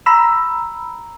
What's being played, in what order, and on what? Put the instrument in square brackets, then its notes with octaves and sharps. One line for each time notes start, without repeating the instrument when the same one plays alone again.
[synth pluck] A#5 B5 E6